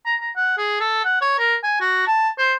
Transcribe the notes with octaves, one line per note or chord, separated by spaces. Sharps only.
A#5
A#5
F#5
G#4
A4
F#5
C#5
A#4
G#5
F#4
A5
C5